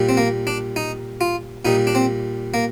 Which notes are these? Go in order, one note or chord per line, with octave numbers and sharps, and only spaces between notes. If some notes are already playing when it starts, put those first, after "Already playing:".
Already playing: A#2 G3
C4
A#3
D4
D#4
F4
A#2 G3 D#4
D4
C4
A#3